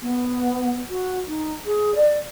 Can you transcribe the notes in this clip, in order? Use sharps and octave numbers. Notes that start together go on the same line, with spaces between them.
B3
F#4
D#4
G#4
D5